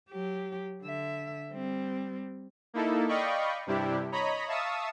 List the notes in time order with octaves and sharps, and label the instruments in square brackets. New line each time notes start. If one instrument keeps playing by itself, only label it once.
[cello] F#3 G4
D3 E5
G3 C4
[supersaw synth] A#3 D#4 E4 A4
D5 D#5 F5 G5 B5 C#6
G2 C3 G3 D4 E4 G4
C#5 D#5 A#5 B5
E5 F5 A5 C#6 D#6 E6